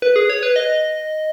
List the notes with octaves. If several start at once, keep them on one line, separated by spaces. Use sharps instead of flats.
B4
G#4
C#5
B4
D#5